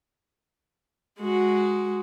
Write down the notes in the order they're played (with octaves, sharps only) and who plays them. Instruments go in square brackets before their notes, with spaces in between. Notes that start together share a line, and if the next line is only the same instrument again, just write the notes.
[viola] G#3 F#4